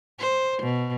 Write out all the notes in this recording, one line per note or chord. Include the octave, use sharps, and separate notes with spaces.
C5
B2